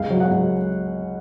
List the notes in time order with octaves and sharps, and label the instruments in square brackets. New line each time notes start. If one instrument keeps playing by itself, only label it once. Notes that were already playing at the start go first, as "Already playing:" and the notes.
Already playing: [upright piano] C#2 F5
F#3
F#5
C#2